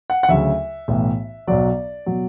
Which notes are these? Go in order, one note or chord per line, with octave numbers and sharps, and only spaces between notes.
F#5
F#5
D2 C#3 F#3 E5
B1 A2 E3
B1 B2 F#3 D5
B2 F#3